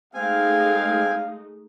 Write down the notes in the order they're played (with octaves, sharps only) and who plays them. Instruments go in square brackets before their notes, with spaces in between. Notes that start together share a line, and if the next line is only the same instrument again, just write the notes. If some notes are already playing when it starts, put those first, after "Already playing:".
[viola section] G#3 A3 D#4 [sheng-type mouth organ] C4 G#5 [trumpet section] F5